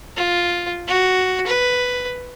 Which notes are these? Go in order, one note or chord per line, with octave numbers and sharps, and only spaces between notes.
F4
F#4
B4